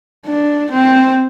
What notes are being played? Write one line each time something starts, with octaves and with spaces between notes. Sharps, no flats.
D4
C4